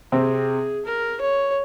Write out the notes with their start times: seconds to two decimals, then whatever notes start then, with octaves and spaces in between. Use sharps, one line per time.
0.12 C3 C4 G#4
0.85 A#4
1.21 C#5